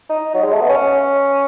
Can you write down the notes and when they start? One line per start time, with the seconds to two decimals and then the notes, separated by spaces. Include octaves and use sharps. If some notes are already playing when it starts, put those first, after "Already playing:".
0.09 D#4
0.34 F#3
0.43 G#3
0.52 A3
0.61 B3
0.69 C#4